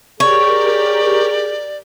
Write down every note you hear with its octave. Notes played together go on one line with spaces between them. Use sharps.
G4 G#4 A#4 C#5 D5 G5